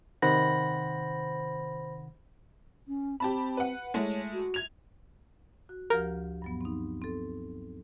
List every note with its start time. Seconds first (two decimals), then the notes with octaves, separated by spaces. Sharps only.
0.22 C3 D#3 C5 F#5 B5 A#6
2.88 C#4
3.20 C4 G4 A5 B5
3.57 B4 F#5
3.94 G#3 A3 E4 C#5
4.33 F#4
4.54 G#6 F7
5.69 F#4
5.90 D2 F3 G4 A#4
6.42 G2 F#3 B3
6.61 C4 D#4
7.02 C4 A4